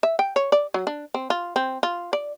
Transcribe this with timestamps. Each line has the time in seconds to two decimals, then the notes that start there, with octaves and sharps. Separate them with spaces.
0.03 E5
0.19 G5
0.36 C#5
0.52 D5
0.74 F#3
0.87 D4
1.14 C4
1.30 F4
1.56 C4
1.83 F4
2.13 D5